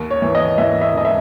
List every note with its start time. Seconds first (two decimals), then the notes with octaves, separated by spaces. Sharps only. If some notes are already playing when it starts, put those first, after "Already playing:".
Already playing: D#2
0.11 C#5
0.22 E3
0.35 D#5
0.58 E3 E5
0.81 E5
0.93 E1 D#5
1.05 E5